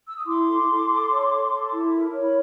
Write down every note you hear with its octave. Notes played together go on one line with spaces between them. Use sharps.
E6
D#6
E4 C6 D6
A4
A4
A4
C#5
A4
A4
E4
A#4
C#5
B5